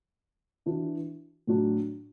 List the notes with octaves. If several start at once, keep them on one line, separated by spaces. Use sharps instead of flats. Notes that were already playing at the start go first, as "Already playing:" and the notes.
E3 D4 F#4
A2 F#3 D4 F#4